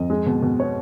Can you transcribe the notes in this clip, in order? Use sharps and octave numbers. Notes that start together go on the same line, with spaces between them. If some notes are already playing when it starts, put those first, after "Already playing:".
Already playing: F2 D#5
G#3
B2
B2
B3 C#5